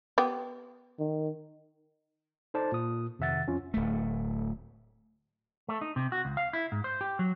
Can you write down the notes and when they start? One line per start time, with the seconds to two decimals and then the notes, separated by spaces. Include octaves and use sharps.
0.18 B3 G4
0.99 D#3
2.54 D#4 A4 C5 D5 A5
2.72 A#2 D#6
3.19 F2 C3 D#3 E5 F#5 A6
3.48 F2 C#4 F4
3.74 D1 A3
5.68 A3
5.81 D#4
5.96 C3
6.12 F#4
6.25 C#2
6.37 F5
6.53 E4
6.72 G#2
6.84 C5
7.01 G4
7.19 F#3